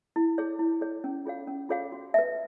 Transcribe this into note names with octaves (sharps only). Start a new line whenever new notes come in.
E4
G#4 C#5
E4
G#4 C#5
C#4
F4 G#4 C#5 F5
C#4
F4 G#4 C#5 F5
F#4
B4 E5